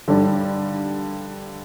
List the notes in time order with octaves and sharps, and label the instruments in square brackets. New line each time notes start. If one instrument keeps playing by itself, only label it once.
[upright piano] G2 D3 G3 D4